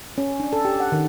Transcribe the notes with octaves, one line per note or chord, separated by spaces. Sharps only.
C#4
D4
A4
G4
F#5
D#3